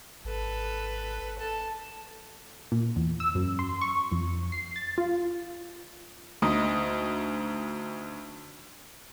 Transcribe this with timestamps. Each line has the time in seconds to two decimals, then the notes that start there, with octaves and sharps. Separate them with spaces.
0.25 G#1 A4 B4
1.39 A4 A5
2.72 A#2
2.96 E2
3.20 E6
3.35 F#2
3.59 C6
3.81 C#6
4.12 F2
4.52 C7
4.76 A6
4.98 F4
6.42 D2 D#4 A#5 D#6